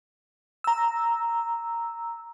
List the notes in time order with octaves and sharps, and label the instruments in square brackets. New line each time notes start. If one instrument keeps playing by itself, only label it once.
[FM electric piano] A#5 E6